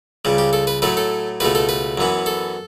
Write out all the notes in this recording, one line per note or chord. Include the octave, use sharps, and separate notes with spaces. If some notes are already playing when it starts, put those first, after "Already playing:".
C#2 C#3 G3
G4
A4
B4
A2 F#3 A3 B4
A4
C#2 B2 A3 B4
A4
B4
F#2 E3 B3
A4